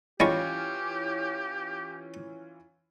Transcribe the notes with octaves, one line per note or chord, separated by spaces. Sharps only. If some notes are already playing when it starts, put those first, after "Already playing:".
E3 G3 G#3 C#4 F4 G4 C#6